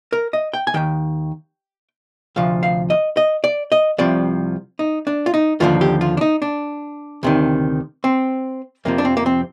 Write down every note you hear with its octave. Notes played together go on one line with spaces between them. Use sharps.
A#4
D#5
G5
G#5
D#2 D#3 G5
D2 C3 F3 F5
F5
D#5
D#5
D5
D#5
C2 C3 F3 D5
D#4
D4
F4
D#4
D#2 D3 F3 F4
G4
F4
D4
D#4
D4
D2 C3 D#3
C4
F2 C3 F3 A#3
D4
C4
A#3
C4